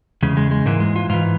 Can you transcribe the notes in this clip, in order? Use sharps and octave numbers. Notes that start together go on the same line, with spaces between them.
E2 C#3 G#3
G#3
G#3
G#2 E3 A#3
G#3
F4
G#2 E3 F4